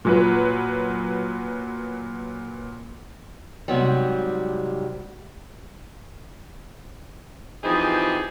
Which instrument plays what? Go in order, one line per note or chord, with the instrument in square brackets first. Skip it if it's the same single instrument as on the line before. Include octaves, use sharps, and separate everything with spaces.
[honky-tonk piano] A#2 F#3 B4
[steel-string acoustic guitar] G#2 C3 F#3 G3
[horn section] E3 F3 C4 D#4 G4 G#4